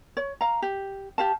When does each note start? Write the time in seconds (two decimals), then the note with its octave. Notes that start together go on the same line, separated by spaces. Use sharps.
0.17 C#5
0.41 F5 A#5
0.62 G4
1.18 G4 F5 A5